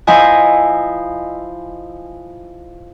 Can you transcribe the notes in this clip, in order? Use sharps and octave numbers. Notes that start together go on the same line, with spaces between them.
F3 E4 D#5 G#5